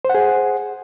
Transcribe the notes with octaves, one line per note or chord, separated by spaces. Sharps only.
G#4 C5 F#5